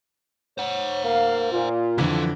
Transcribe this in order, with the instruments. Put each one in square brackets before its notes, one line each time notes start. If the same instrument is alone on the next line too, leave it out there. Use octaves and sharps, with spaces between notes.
[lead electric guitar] C5 F#5 [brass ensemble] C#5
[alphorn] A#3 [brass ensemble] F5
[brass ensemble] A#2 [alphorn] F4
[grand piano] F2 D3 E3 [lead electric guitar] F3 A4